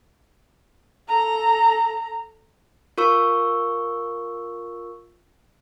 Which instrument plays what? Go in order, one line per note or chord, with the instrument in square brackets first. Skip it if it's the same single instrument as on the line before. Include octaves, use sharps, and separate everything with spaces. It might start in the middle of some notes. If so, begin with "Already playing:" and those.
[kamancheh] A4 A#5
[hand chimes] F4 A#4 C#6 E6